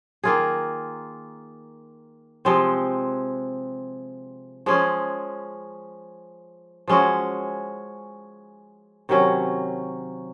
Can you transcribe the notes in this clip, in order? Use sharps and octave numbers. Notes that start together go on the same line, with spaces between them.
D#3 A#3 F4 G#4
C3 F3 G#3 C4
F3 G#3 C#4 G#4
F3 G#3 C#4 F#4
C3 D#3 F#3 C#4